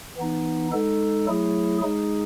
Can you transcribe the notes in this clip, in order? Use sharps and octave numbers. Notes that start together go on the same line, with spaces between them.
E3 B3 D#4
G#3 D#4 A4
F#3 A3 E4 G#4
G#3 D#4 G#4